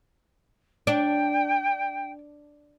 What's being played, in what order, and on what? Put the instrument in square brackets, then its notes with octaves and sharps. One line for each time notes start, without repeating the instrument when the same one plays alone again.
[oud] D4 [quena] G5